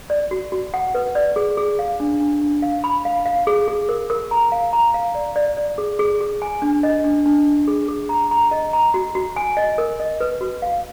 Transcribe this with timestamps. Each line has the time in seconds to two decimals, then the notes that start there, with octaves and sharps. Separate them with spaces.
0.10 D5
0.31 F#4
0.52 F#4
0.74 F#5
0.95 B4
1.15 D5
1.36 G#4
1.57 G#4
1.79 F5
2.00 D4
2.20 D4
2.42 D4
2.62 F5
2.84 B5
3.05 F5
3.26 F5
3.47 G#4
3.68 G#4
3.89 A#4
4.10 A#4
4.31 A#5
4.52 F5
4.73 A#5
4.94 F5
5.15 D5
5.36 D5
5.57 D5
5.78 G#4
5.99 G#4
6.21 G#4
6.42 G#5
6.62 D4
6.83 D#5
7.04 D4
7.26 D4
7.46 D4
7.67 G#4
7.88 G#4
8.09 A#5
8.31 A#5
8.51 D#5
8.73 A#5
8.94 F#4
9.15 F#4
9.36 G#5
9.57 D#5
9.78 A#4
10.00 D#5
10.21 B4
10.41 F#4
10.62 F5